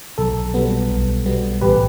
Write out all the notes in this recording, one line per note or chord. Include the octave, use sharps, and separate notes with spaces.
B1 A4
B2 G3 B3
B1
B2 G3 B3
A1 G4 B4